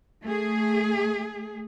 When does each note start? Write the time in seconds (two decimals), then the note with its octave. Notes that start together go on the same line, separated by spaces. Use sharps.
0.23 A3 G#4